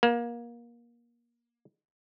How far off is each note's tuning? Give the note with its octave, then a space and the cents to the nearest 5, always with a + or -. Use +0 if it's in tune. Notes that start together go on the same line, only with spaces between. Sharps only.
A#3 +25